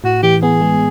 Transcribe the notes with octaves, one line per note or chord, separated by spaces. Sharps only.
A2 F#4
E3 G4
B3 G#4
G#3